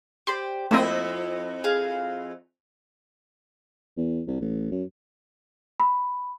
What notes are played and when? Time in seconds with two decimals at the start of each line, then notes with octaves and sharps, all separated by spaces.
0.27 G4 C5 D5 C6
0.71 F2 A3 A#3 C4 E4 C5 D#5
1.64 G#4 F5
3.97 E2
4.27 C2
4.41 A1
4.71 F#2
5.80 B5